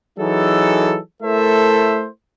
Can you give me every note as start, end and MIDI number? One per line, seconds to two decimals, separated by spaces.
0.19 0.99 52
0.19 0.99 54
0.19 0.99 63
0.19 0.99 68
0.19 0.99 69
1.23 2.08 57
1.23 2.08 64
1.23 2.08 69
1.23 2.08 70
1.23 2.08 72
1.23 2.08 76